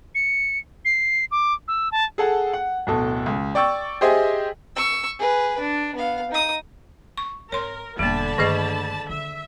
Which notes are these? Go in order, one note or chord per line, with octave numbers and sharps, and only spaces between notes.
C#7
C7
D6
E6
A5
G#4 A4 F#5 A5
F#5
D1 B2 A4
C#2
D5 G5 C#6 E6 A6
G4 G#4 C5 D#5 E5 G#5
C#6 E6
G#4 B4
D4
B3 F5
D#4 D#6
C#6
G#1 A#4 C#5 C6
E1 D3 G3 A#3 A5 B5
G2 D#3 A3 G#4 D#5
D3 E5